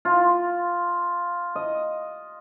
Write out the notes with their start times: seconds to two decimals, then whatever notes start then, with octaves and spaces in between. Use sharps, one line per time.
0.05 F4
1.55 D#5